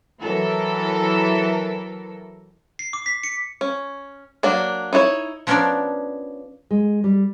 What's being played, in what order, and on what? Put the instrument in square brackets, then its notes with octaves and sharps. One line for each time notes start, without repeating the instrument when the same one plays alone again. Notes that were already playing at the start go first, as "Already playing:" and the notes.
[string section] E3 F#3 A4 A#4
[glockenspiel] C7
D6
B6
C#7
[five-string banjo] C#4
F#3 A#3 D4
D#4 E4 F#4 C#5
[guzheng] F3 B3 C#4 D4 A#4 D5
[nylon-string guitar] G#3
G3